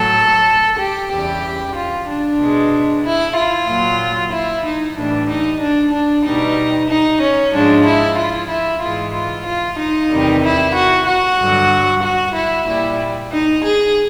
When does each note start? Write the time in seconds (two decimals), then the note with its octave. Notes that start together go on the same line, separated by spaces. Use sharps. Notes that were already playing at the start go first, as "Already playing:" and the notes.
Already playing: A2 F#3 A4
0.79 G4
1.11 E2 C#3 E3 G3 G4
1.75 F4
2.07 D4
2.39 B2 G#3
3.04 E4
3.36 F4
3.68 A#2 F#3
4.32 E4
4.65 D#4
4.97 A2 E3 G3 D4
5.28 D#4
5.61 D4
5.93 D4
6.25 B2 G3 D#4
6.89 D#4
7.21 C#4
7.53 G#2 F3 G#3 D4
7.85 E4
8.17 F4
8.50 E4
8.82 G#2 E3 G#3 F4
9.14 F4
9.46 F4
9.78 D#4
10.10 E2 C3 D#3 G3
10.43 E4
10.74 F#4
11.06 F#4
11.38 G2 D3 F#3
12.03 F#4
12.35 E4
12.67 A#2 G3 E4
13.31 D#4
13.64 G#4